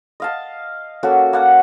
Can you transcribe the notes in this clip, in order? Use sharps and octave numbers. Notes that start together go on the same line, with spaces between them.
D#5 F5 A5
A#3 C#4 F#4 A4
A#3 F#5 A5